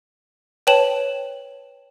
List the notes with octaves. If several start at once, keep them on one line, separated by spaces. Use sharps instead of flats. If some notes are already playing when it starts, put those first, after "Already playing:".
B4 C#5 G5 A5 E7 F#7